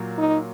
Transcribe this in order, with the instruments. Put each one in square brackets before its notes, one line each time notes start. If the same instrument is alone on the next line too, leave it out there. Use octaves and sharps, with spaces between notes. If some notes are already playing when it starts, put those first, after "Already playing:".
Already playing: [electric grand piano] A#2 F#3 A#3
[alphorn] D#4